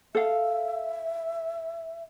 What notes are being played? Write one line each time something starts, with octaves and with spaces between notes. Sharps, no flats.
A4 E5 F5